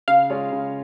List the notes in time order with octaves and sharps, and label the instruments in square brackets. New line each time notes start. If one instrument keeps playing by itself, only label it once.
[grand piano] C#3 [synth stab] F5
[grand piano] G#3 F4 C#5
C#3